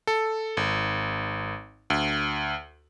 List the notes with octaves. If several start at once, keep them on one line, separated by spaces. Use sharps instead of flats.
A4
G#1
D2